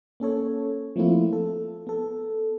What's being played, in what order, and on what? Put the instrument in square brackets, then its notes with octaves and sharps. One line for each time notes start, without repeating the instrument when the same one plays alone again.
[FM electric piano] A#3 C#4 A4 C#5
F3 A3 A#3 C4 E4 F4
A4
B3 A4